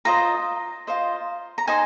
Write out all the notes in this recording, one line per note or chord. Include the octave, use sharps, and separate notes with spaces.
F4 C5 D#5 A#5
F4 C5 D#5
A#5
D#4 C5 D#5 G#5